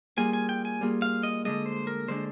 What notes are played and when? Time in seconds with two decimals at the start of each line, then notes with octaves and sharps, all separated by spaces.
0.17 G3 A#3 F4 G#4 G#5
0.33 G#5
0.49 G5
0.65 G#5
0.81 G3 A#3 F4 G#4
1.02 F5
1.23 D#5
1.45 D3 G#3 D4 D#5
1.66 C5
1.87 A#4
2.08 D3 G#3 D4 C5